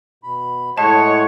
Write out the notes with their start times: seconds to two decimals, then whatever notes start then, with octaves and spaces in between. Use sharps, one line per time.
0.24 B2 B5
0.78 A2 G#3 C#5 D#5 F#5 A5